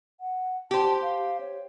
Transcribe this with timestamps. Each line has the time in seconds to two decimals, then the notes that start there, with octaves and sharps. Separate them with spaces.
0.21 F#5
0.71 G4 C5 A5
1.02 F5
1.40 C#5